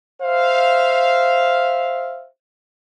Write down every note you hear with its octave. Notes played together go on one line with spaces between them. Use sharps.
C5 E5 F5